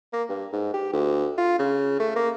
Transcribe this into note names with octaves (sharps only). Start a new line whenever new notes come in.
A#3
G2
G#2
G4
D2
F4
C#3
A3
A#3